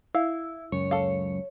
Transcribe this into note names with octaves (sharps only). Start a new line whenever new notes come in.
E4 F5
F#1 C#2 F#2 C#5
A4 F5